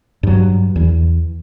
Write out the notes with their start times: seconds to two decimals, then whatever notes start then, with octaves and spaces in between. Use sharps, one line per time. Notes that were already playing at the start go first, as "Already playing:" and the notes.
0.23 G2 F#3
0.76 E2 E3